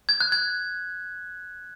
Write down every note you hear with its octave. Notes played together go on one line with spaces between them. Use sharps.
G#6
F#6
G#6